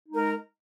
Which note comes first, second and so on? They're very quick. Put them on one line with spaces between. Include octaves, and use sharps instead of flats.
D#4 G#3 A#4